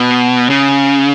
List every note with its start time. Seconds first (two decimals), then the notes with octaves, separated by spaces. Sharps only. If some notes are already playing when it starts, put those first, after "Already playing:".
Already playing: B2
0.50 C#3